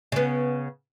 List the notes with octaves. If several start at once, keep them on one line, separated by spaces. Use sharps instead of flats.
C#3 B3